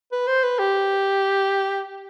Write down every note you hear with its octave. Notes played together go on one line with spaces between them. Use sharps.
B4
C5
B4
G4